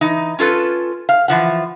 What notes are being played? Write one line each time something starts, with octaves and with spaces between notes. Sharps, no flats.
E3 D#4
C#4 F4 A4 B4
F5
E3 F3 F#5